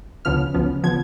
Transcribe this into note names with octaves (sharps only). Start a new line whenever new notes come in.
D2 C#3 F3 B3 F6
D2 C#3 F3 B3
C#3 F3 B3 G#6